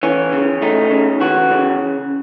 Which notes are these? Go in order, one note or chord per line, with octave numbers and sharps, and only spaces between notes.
E3 C#4
C#3
A3 D#4
C#3
E3 F#4
C#3